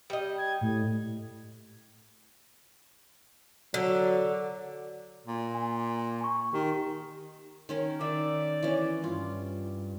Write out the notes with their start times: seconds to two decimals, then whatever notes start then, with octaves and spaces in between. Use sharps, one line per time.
0.10 G3 D#5
0.38 G#6
0.61 A2
3.74 D3 F#3
5.26 A#2
5.55 G#5
6.21 G#5 C#6
6.53 D#3 G4
7.69 D#3 C#4 A#4
8.00 D#3 D5 E5
8.63 E3 C#4
9.04 G2 F4